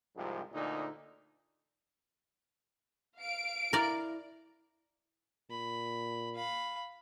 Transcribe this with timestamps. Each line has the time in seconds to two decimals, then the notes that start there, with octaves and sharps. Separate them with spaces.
0.16 C2 G#2 C3 F3
0.52 D2 A#2 D3 D#4
3.18 F5 D7
3.73 E4 A#4 D5
5.50 A#2 B5
6.35 F5 B5